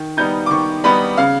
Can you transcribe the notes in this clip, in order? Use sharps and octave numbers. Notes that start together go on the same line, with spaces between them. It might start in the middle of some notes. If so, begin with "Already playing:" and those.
Already playing: D#3
G3 B3 D#4 G6
D6
D#3 C#6
G3 B3 D#4 B5
C#3 F5